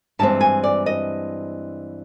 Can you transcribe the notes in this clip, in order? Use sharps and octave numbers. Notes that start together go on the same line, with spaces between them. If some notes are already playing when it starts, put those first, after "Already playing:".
G2 E3 G#3 C4 A5
G#5
D5
D#5